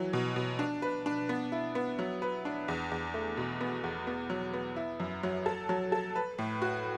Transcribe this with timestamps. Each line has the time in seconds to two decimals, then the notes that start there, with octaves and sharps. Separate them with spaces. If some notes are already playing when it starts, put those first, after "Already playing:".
Already playing: E3 F#3
0.13 B2
0.36 B2
0.59 D4
0.82 B4
1.06 D4
1.29 B3
1.52 E4
1.75 B3
1.99 F#3
2.22 B4
2.45 D4
2.68 E2
2.91 E2
3.14 A3
3.37 B2
3.61 B3
3.84 E2
4.07 B3
4.30 F#3
4.53 B3
4.76 E4
5.00 F#2
5.23 F#3
5.46 A4
5.69 F#3
5.92 A4
6.16 B4
6.38 A2
6.62 F#4